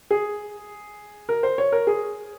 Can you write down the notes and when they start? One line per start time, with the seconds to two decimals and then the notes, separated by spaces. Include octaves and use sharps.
0.11 G#4
1.29 A#4
1.43 C5
1.58 C#5
1.72 A#4
1.87 G#4